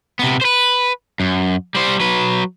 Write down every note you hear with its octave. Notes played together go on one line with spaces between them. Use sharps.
C3 B3
B4 C5
F#2
G3 C5
F#3 B4